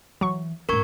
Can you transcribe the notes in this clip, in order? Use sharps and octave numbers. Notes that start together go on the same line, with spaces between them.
E3 F#3 C#6
G#2 C#4 A#4 C#6 G#6